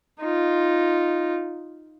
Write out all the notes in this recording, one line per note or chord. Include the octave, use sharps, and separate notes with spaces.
D#4 F4